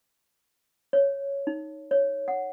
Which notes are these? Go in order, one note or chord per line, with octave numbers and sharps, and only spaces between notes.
C#5
D#4
C#5
F#5